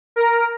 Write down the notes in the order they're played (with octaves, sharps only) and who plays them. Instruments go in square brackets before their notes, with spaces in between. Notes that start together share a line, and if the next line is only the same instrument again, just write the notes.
[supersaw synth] A#4